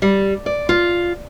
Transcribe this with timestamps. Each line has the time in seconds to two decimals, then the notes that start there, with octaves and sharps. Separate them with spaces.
0.02 G3
0.46 D5
0.69 F4